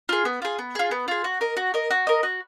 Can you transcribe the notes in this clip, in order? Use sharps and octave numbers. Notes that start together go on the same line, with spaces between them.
F4 G#4
B3
F4 G#4
B3
F4 G#4
B3
F4 G#4
F#4
A#4 D#5
F#4
A#4 D#5
F#4
A#4 D#5
F#4